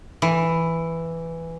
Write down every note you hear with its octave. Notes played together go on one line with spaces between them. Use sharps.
E3